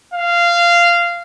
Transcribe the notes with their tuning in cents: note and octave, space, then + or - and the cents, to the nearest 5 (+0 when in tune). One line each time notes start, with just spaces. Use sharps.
F5 -15